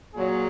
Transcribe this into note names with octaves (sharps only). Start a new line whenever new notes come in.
A#2 F#3 G#4